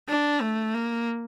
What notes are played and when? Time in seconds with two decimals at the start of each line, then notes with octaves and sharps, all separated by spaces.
0.09 D4
0.41 A3
0.74 A#3